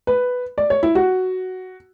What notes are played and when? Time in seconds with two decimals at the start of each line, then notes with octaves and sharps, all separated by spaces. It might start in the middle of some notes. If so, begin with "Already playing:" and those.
0.07 B4
0.58 D5
0.70 C#5
0.83 E4
0.95 F#4